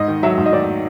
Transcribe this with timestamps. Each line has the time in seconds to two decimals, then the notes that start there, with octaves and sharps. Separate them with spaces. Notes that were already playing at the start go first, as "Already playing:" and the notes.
Already playing: G#2 D#5
0.08 D#3
0.23 F#3 E5
0.38 G#2
0.46 D#5
0.52 D#3 D5